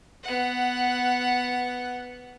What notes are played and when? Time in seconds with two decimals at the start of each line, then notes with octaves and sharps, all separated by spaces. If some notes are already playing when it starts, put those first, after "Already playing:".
0.23 B3 F#5